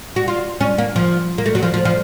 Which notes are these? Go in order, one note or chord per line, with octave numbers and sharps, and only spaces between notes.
F#4
F4
C#4
A#3
F3
A#3
A3
F#3
F3
F3
F3